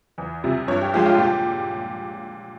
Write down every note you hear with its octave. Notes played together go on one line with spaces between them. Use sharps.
E2
C3 G3
G2 C#5
G4
F3 G#3 G4
F4
A#2 G4